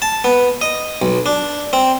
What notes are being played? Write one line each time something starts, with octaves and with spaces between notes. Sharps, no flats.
A5
B3
D#5
B1
D4
C4